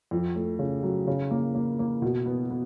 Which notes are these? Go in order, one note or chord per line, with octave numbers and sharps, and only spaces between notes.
F2
A3
C#3
F#3
C#3
A#3
A#3
A#3
B2
B3
B3